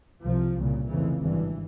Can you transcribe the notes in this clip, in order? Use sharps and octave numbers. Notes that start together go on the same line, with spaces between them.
C2 C3 F3
C2 A#2 C#3
F1 F2 C#3 E3
G#1 G2 E3